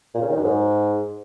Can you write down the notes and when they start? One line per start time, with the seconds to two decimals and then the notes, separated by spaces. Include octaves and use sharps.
0.15 A#2
0.22 C#3
0.29 D#3
0.36 F#2
0.44 G#2